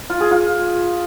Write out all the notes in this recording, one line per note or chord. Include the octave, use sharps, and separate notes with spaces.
F4
G#4
F4